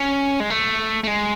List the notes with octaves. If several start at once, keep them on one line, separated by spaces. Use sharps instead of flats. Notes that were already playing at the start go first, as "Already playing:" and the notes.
Already playing: C#4
G#3
A3
A3
G#3